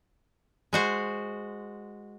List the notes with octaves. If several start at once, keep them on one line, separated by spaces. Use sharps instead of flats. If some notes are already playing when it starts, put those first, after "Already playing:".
G#3 F#4 C5